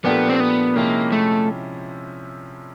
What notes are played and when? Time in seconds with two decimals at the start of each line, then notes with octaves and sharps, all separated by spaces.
0.05 A#2 F3 A3 B3 D4 G4
0.29 C4
0.40 B3
0.76 C3 F3 G#3 A#3 C#4 E4
1.12 A3